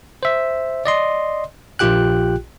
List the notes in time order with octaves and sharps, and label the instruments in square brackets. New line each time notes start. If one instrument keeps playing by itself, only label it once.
[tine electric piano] C5 E5
D5 D#5 C6
A#1 F4 G4 G5 F#6